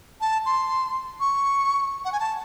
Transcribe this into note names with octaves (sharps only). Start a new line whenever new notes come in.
A5
C6
C#6
F#5
G#5
A5